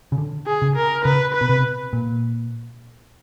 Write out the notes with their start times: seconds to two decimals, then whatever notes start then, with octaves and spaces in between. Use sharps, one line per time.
0.12 C#3
0.18 D3
0.47 G#4
0.62 C#3
0.76 A#4
1.05 C#3 B4
1.34 B4
1.41 B2
1.49 C3
1.93 A#2